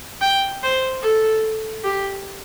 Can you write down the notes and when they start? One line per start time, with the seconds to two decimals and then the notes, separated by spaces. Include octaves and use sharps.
0.21 G5
0.63 C5
1.02 A4
1.84 G4